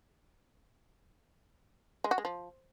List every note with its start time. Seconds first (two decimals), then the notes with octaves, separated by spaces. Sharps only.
2.04 G#3
2.11 F#4
2.18 G#3
2.25 F3